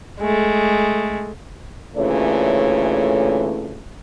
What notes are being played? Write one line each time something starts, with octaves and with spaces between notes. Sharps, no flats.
G#3 A3
D2 A#2 C#3 E3 A3 C#5